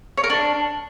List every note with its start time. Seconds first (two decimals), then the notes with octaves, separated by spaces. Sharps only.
0.18 C#5
0.24 A#4
0.30 D4